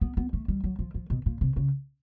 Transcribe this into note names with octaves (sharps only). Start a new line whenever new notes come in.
B3
B3
A3
G3
F#3
F3
F3
B2
A#2
C3
C#3